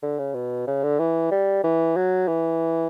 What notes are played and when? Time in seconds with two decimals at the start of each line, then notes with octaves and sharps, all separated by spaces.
0.03 D3
0.19 C#3
0.34 B2
0.67 C#3
0.83 D3
0.99 E3
1.31 G3
1.64 E3
1.96 F#3
2.28 E3